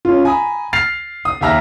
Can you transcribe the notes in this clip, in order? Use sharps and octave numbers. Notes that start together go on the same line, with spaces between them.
C#4 F4
G#5 A#5 B5 D#6
F6 A6 C7 F7
D#6
D#2 G4 E5 A#5 F6 A#6